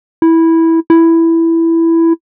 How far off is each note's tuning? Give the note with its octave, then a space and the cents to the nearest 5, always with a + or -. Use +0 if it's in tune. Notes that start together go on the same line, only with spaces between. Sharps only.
E4 -10
E4 +5